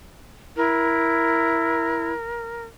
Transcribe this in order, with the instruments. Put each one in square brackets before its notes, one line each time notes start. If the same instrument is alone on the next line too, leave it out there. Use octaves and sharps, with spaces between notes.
[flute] E4 [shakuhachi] A#4